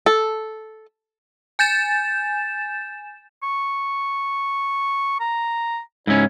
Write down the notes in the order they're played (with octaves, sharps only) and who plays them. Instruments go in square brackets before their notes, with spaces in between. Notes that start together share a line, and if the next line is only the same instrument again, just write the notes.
[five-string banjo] A4
[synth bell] G#5 G6 A6 E7
[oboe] C#6
A#5
[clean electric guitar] G#2 C#4 [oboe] E4